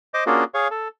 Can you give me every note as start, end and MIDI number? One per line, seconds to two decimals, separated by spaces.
0.14 0.24 72
0.14 0.24 75
0.14 0.24 86
0.26 0.44 58
0.26 0.44 61
0.26 0.44 62
0.26 0.44 65
0.26 0.44 66
0.26 0.44 68
0.54 0.68 68
0.54 0.68 73
0.54 0.68 77
0.71 0.88 69